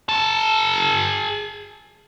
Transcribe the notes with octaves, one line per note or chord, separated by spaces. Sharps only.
G#4 A5